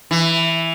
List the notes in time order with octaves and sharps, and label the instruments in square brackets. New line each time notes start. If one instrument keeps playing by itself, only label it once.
[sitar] E3